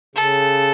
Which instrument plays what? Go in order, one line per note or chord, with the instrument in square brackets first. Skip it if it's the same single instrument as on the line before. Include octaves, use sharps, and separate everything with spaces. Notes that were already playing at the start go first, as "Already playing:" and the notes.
[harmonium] C#3 [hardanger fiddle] A4